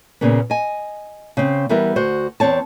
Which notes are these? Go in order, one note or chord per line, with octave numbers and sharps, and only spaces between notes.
A#2 C#3 A#3 B3
D#5 G#5
C#3 C4
E3 G3 B3 A#4 E5
D2 F#4 C5
E2 C3 C4 C#5 A5